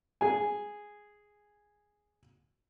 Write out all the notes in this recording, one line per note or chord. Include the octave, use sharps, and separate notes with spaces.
G#4 G#5